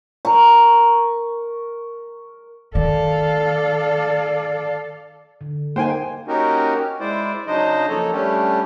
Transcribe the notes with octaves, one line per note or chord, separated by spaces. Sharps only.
A#4 C#6
D#3 A4 D5 F5
D3
A#3 D#4 C5 G5 G#5
A#3 C#4 D#4 F#4 G4 A#4
G#3 E4 C5 D5
C#3 F#3 D4 D#4 C5 D#5
F3 A#3 A4 C#5
G3 A3 C#4 D4 G4